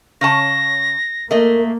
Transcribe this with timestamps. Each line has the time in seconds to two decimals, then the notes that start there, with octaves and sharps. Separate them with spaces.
0.21 C#3 C#4 A5 A#6
1.31 A3 A#3 A#4 D#5